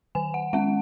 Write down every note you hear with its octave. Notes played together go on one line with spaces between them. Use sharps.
D#3 G#5
F#5
G#3 C#4 F#5